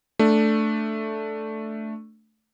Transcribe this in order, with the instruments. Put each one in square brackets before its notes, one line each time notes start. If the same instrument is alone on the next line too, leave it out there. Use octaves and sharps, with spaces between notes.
[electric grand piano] A3 D4